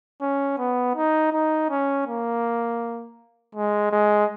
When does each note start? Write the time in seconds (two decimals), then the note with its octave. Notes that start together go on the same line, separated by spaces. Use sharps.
0.21 C#4
0.58 B3
0.95 D#4
1.33 D#4
1.70 C#4
2.07 A#3
3.55 G#3
3.92 G#3